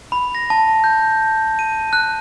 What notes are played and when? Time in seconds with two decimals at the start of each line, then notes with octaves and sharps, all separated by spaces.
0.12 B5
0.35 A#6
0.50 A5
0.84 G6
1.59 D#7
1.93 F#6